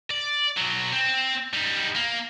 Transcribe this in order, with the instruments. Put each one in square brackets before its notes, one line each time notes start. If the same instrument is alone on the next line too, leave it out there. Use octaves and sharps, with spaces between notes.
[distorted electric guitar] D5
B2 F#3
C4
G3 D#4
A#3